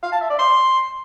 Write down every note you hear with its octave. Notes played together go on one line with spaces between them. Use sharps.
F5
A5
E5
D5
C6